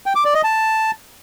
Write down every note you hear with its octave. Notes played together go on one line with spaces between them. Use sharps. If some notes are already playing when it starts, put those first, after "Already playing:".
G5
D6
D5
D#5
A5